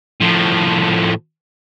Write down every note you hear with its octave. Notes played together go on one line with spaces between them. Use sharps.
A2 F3